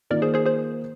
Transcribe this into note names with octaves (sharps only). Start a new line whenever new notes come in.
D#3 A#3 F4 A#4 D5
G#4 C5
G#4 C5
G#4 C5